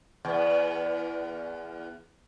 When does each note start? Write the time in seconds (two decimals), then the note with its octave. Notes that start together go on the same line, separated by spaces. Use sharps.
0.25 E2 B3